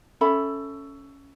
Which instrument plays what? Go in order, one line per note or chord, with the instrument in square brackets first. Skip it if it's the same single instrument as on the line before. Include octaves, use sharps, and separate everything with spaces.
[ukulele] C#4 A4 E5 B5